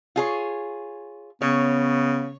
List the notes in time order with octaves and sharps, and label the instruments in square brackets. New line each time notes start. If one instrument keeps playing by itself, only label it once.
[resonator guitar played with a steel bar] F4 G#4 C#5
[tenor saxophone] C#3 [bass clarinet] B3 [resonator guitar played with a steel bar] C#5